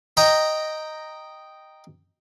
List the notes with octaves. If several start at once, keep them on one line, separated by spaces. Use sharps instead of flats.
D#5 G5 A#5